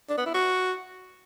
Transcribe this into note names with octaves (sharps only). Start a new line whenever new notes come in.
D4
B3
E4
F#4